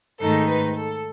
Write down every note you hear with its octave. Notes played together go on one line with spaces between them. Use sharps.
G#2 D#3 A3 D#4 A4
B4
A4